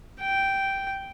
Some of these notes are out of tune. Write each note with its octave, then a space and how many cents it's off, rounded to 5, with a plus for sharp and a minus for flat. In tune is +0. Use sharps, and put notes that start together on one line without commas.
G5 -5